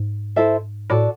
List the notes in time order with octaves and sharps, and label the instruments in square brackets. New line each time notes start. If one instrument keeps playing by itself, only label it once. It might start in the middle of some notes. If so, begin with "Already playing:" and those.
Already playing: [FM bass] G#2
[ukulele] E4 A4 C5 E5
[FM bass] A2 [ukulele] F#4 A4 D5